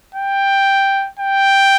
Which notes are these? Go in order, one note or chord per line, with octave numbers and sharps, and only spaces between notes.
G5
G5